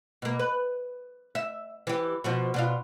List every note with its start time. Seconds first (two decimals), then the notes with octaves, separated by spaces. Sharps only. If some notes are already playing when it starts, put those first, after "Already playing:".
0.22 B2 A#3
0.39 B4
1.35 E5
1.87 E3 G4
2.24 B2 F3 F#4
2.54 B2 D4 F4